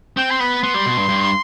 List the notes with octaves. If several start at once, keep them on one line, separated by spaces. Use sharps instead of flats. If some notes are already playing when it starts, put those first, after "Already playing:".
C4 G5
C6
B3 B5
B3 C6
G3
B2
G2
G2